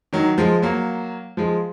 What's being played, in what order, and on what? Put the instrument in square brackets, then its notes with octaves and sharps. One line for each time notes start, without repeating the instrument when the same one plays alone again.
[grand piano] D#3 F#3
F3 G#3
F#3 A#3
F3 G#3